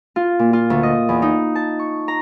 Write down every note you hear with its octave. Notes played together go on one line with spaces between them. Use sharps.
F4
A#2
F4
D2
D#5
E2
D#4
A5
C#6
A#5